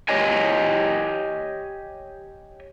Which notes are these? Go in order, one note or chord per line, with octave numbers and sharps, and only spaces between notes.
G4 C#5 D#5 G#5